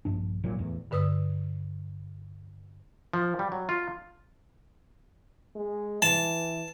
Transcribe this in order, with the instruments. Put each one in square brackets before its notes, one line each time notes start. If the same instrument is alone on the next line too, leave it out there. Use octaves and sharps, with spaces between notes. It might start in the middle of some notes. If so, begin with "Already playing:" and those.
[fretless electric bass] A#1 G2 D4
G#1 A#2 F#3
E2 A2
[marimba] G2 D3 B4 D#6 E6
[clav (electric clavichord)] F3
G3
F#3
F4
[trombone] G#3
[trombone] E3 [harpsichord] A5